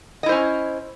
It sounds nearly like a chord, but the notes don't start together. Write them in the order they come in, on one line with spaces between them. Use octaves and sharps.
D#5 E4 C5 C#4